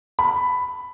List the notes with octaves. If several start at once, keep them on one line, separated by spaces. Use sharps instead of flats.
B5